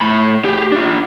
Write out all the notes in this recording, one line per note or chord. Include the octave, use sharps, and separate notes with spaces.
A2 B5
G4 G#4
D4 F4